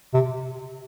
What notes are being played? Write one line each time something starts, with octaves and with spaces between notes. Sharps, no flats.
C3